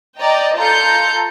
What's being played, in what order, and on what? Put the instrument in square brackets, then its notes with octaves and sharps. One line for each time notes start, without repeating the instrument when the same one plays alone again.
[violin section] D5 D#5 G5 A#5
F4 A4 A#5 G6 C#7